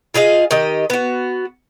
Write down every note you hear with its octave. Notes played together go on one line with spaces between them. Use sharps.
F4 G#4 D#5 F5
D#3 G4 D#5
B3 F#4